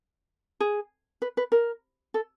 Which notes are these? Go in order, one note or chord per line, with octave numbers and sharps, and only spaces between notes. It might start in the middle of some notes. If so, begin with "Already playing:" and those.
G#4
B4
B4
A#4
A4